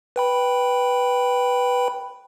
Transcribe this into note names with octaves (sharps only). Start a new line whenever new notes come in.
B4 G5 B5